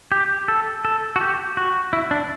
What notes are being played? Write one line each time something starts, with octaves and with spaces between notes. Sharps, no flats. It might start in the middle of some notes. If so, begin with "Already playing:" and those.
G4
A4
A4
F#4
G4
F#4
E4
D4